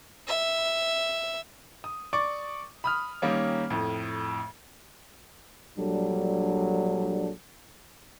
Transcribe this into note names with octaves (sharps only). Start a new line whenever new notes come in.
E5
D#6
D5 C#6 D6
B5 D#6 F6
D#3 G3 A#3 C#4
F2 A2
A#1 F#3 G3 D4 A4